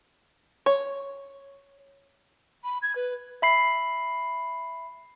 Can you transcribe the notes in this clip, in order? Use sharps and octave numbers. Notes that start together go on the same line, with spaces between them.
C#5
B5
G#6
B4
E5 B5 C7